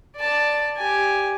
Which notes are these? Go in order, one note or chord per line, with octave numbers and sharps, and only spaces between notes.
D5 A5
G4 G#5